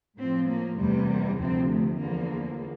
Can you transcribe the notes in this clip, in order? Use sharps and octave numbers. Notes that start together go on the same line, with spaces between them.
A2 F3 C4
A#3
E2 C3 G3 A3
A#3
D2 C3 F3 C4
A3
E2 D3 F3 A#3